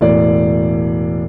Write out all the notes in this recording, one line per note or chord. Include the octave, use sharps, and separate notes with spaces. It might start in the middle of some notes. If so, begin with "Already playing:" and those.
E1 A2 D5